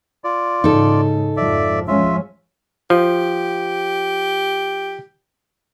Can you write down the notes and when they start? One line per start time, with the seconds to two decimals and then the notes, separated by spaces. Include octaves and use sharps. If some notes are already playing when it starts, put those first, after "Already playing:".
0.24 F4 D5
0.64 G#2 C#3 D#4 A4
1.37 F2 G#2 F3 D5 E5
1.88 F3 G#3 C#4 F4 E5
2.90 F3 G4